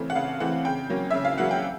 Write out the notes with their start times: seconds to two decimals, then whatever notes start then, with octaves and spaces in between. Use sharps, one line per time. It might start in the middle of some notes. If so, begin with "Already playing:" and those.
Already playing: C#3 E3 A3 C4
0.10 F#5
0.15 C#3 F5
0.40 E3 A3 C4 F#5
0.65 C#3 G5
0.90 F#3 A#3 C#4
1.11 C#3 E5
1.25 F5
1.38 F#3 A#3 C#4 F#5
1.51 G5